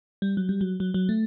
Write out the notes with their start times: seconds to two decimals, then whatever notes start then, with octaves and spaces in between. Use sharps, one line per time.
0.22 G3
0.37 F#3
0.49 G3
0.61 F#3
0.80 F#3
0.94 F#3
1.09 A3